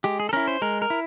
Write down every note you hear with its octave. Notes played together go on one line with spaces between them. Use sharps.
G#3 G4
G#4
A4
C#4 E4 A#4
C5
G#3 A#4
A#4
E4